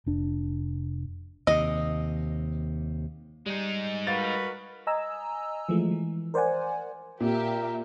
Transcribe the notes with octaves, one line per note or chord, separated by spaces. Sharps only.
F1 D4
D#2 C3 D#5
G3 G#3 D#4
F#4 A#4 B4 F5 A6
D#5 G#5 A#5 E6
E3 F3 G#3 A3
E3
A#4 C5 D5 F#5 G#5
A#2 G4 A#4 E5